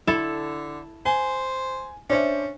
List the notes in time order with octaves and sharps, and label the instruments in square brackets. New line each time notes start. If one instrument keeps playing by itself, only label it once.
[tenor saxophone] D3 [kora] E4 A4 [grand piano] E7
[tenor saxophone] C5 [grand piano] G#5
[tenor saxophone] C#4 [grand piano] D4 C5 E5